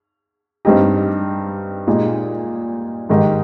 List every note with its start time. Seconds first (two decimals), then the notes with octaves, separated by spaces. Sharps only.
0.65 G2 G3 C4 D#4 G4
1.87 A#2 G#3 D#4 G4
3.09 G#2 D#3 G#3 D#4 G4